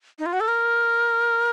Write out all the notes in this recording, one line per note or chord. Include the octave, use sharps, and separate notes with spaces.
D#4
F4
F#4
A4
A#4